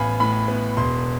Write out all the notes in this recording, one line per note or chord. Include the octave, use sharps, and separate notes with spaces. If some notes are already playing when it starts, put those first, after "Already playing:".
Already playing: A1 B3 F5 G#5 B5
A2 B5
B3
E1 C6